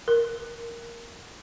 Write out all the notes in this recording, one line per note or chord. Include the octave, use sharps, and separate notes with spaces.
A#4